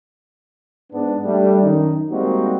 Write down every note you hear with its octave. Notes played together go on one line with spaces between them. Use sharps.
G#2 B3 D4
G3 A3 D4
F#2 D#3 D#4
G3 G#3 A#3 C4 D#4 F#4